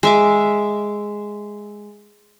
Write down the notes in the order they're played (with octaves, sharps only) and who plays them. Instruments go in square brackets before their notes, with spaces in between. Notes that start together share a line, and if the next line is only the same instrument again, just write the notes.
[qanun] G#3 E5 D6